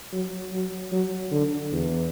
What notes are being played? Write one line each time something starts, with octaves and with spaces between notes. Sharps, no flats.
F#3
F#3
F#3
D3
E2